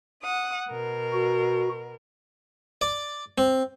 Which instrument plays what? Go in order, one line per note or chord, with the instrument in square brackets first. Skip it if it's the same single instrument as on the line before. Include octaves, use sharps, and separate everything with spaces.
[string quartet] F#5 D#6
B2 A#4
[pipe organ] F#4
[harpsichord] D5
C4